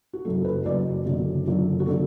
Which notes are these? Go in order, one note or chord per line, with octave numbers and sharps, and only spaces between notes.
F#4
F#1 F#2 F#3 A4
B4
F#1 F#2 F#3 D5
F#1 F#2 D3 F#3
F#1 F#2 D3 F#3
F#4
D3 F#3 A4